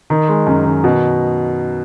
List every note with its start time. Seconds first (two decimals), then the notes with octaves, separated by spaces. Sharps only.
0.10 D#3
0.28 G#3
0.47 F#2
0.65 D#3
0.84 B2